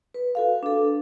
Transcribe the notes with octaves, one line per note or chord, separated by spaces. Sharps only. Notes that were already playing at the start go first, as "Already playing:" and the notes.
B4
F#4 A4 F5
D4 A4